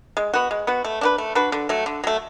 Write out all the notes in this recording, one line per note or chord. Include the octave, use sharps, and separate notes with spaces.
G#3
B3 F#4
G#3
B3 F#4
A3
D4 F#4 B4
A3
D4 F#4 B4
D3
F#3 A3
D3
F#3 A3